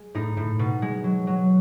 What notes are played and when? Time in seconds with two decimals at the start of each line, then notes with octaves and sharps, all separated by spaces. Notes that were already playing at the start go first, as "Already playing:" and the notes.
Already playing: G#3
0.15 A2 D#4
0.37 A2
0.59 B2
0.82 G#3
1.04 F#3
1.27 F#3